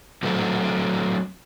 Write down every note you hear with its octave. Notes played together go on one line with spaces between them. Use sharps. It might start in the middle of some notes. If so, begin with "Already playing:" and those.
F#3 A3 C4